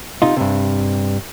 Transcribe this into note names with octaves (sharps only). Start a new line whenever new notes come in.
C3 D#4 F4
G2 C3